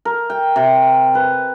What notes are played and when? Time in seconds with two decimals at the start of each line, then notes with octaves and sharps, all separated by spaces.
0.05 A#4
0.30 G5
0.56 C3
1.15 B4